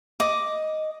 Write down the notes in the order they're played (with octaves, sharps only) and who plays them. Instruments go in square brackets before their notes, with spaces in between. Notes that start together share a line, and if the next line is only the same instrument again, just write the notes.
[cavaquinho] D#5 D6